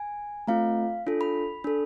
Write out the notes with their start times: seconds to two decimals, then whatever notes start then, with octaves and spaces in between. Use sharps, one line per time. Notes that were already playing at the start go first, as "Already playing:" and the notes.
Already playing: G#5
0.47 A3 C4 F4 F5
1.07 D4 F4 A4
1.21 B5
1.64 D4 A4